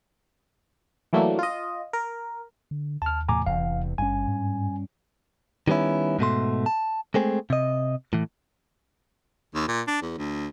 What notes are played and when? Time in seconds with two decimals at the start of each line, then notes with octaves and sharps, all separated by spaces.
1.13 E3 F#3 A3 A#3 D4
1.39 F4 D#5
1.93 A#4
2.71 D3
3.02 D#2 A5 F6
3.29 E2 A2 C3 G#5 A#5 D6
3.46 D#1 E2 C3 E3 F5
3.98 G#1 G2 C#4 G#5
4.28 G#2
5.68 D#3 G3 B3 C#4 E4
6.19 G#2 B2 A3 C6
6.66 A5
7.14 G#3 A3 C4 G#4
7.50 C3 D#5
8.13 A2 E3
9.54 D#2
9.68 A#2
9.87 D4
10.02 E2
10.18 D2